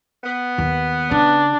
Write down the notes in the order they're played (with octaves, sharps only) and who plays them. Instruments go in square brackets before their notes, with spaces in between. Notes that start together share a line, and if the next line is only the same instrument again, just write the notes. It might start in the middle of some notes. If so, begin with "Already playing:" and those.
[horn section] B3
[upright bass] D#2
[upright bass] C#3 [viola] D4